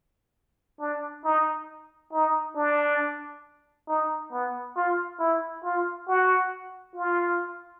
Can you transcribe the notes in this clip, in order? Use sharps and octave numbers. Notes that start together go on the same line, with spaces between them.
D4
D#4
D#4
D4
D#4
B3
F4
E4
F4
F#4
F4